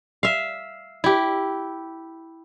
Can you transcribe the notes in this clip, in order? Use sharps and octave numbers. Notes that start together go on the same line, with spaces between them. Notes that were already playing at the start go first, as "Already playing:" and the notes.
E5 F5
E4 G4